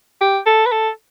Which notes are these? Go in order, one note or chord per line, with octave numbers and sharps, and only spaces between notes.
G4
A4
B4
A4